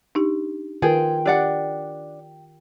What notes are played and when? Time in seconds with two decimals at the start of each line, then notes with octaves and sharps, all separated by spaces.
0.15 D4 D#4 G4
0.82 D#3 F4 G#4 A#4 B4 G5
1.26 D4 G4 D5 F#5